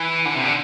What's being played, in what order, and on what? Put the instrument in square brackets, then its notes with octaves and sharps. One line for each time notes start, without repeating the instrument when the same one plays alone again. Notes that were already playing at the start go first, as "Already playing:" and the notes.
Already playing: [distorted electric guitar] E3
D3
C3
D3